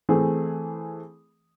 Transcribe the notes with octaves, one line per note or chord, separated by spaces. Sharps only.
E3 A3 C4 G#4